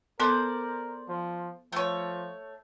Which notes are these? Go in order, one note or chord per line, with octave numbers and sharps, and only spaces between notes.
B3 A4 A#4 C5 D5
F3
F3 A3 C#5